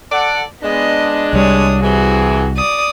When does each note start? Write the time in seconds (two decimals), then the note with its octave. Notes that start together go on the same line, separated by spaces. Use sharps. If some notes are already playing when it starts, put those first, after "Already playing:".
0.11 A4 D5 F#5
0.63 G#3 B3 D4 D#5
1.33 C2 G3 C#5 D#6
1.82 C3 E3 F#4 G#4
2.57 D5 D#6